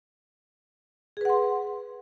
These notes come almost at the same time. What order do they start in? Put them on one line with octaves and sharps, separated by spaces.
G#4 B4 F#5 C6